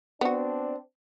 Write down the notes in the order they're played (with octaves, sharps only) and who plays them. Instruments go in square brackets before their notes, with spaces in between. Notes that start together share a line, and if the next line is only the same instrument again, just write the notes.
[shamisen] B3 F#4 [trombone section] C4 D4